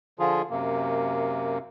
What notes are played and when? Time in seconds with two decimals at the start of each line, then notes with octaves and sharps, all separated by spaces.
0.19 D3 F3 F4 G#4
0.50 F#2 C3 A#3